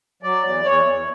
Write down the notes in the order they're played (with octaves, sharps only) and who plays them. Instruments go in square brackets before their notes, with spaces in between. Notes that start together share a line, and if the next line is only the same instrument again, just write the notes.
[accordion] F#3 D5
E2
E2 C#5
E2